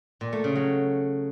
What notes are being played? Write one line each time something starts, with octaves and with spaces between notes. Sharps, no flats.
A#2
A3
C#3
F#3